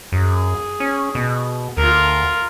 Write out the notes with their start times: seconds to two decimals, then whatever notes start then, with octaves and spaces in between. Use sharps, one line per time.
0.12 F#2 G#4
0.80 C#4
1.15 B2
1.77 D2 F4 A#4